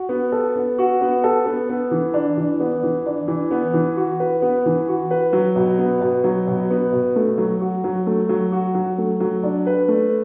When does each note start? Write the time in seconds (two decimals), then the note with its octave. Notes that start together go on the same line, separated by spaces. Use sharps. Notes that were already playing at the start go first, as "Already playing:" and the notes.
Already playing: F#4
0.09 B3
0.32 A4
0.56 B3
0.78 F#4
1.01 B3
1.24 A4
1.46 B3
1.69 B3
1.91 E3
2.14 D4
2.37 E3
2.60 B3
2.83 E3
3.06 D4
3.28 E3
3.51 B3
3.74 E3
3.96 F#4
4.20 B4
4.42 B3
4.66 E3
4.88 F#4
5.11 B4
5.33 F#3
5.56 B2
5.78 B3
6.01 B2
6.24 F#3
6.48 B2
6.70 B3
6.93 B2
7.16 A3
7.38 F#3
7.61 F#4
7.84 F#3
8.07 A3
8.29 F#3
8.52 F#4
8.74 F#3
8.98 A3
9.20 F#3
9.43 D4
9.67 B4
9.88 A3